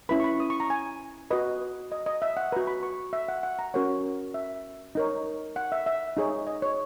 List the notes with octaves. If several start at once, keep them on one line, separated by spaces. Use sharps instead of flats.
C#4 E4 B4 B5
C#6
B5
D#6
C#6
A#5
G#5
F#4 B4 D#5
D#5
D#5
E5
F#5
F#4 B4 A#5
B5
C#6
E5
F#5
F#5
A#5
C#4 F#4 A#4 C#5 F#5
E5
D#4 A#4 C#5
F#5
E5
E5
D#4 G#4 C#5
D#5
C#5